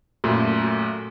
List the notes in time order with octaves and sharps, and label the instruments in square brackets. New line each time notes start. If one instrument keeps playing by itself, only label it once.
[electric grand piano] F#2 A#2 A3 [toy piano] F#4